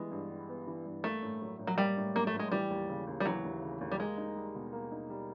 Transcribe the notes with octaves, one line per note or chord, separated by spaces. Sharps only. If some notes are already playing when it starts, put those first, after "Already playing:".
Already playing: E3 G3 G#3 B3
G2
G3
B3
E3
G2
A3 A#3
A2
F#3
A2
F#3
G3 A#3
A2
F#3 A#3
A3
A2
G#3
E3 G3
D#2
C#3
D#2
G3
E3 F#3
D#2
C#3
D#2
G3
G#3 A#3
D#4
G3
B2
A#3
D#4
G3